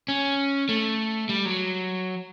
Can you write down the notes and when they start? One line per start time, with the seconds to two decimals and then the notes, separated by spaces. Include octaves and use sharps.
0.08 C#4
0.69 A3
1.29 G3
1.45 F#3